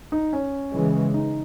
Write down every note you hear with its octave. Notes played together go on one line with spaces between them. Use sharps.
D#4
C#4
C#3 E3 G#3
D#4